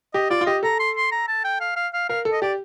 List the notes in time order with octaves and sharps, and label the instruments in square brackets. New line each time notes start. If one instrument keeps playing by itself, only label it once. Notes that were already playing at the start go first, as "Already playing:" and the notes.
[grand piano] G4 [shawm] D#5
[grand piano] F4 [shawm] D5
[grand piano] F4
[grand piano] G4 [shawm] D#5
[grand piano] A4 [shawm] A#5
[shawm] C6
C6
A#5
A5
G5
F5
F5
F5
[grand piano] A#4 [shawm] F5
[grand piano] A4
[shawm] D#5
[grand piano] G4 [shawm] D5